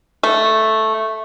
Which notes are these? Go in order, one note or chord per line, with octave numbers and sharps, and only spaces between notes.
A3